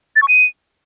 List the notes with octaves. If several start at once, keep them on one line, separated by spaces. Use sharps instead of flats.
A6
C#6
D#7